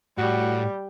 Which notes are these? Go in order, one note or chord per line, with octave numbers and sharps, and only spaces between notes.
A2 G3 F#4